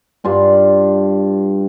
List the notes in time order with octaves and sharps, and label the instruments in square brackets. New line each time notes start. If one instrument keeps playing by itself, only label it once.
[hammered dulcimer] G2 D4 F4 B5